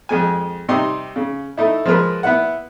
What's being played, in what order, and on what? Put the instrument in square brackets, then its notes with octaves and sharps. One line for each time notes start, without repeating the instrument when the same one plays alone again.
[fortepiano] F2 G#3 G#5
C3 G3 D#4 C6
C#3
A3 D#4 E4
F3 G#3 A#4 B4
B3 E4 F#5